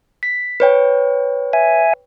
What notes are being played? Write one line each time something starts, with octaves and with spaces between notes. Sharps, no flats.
B6
B4 C#5 G5
E5 G#5